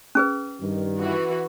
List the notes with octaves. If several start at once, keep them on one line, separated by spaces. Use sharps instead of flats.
C#4 G#4 B4
G2 D#3
E3 F#4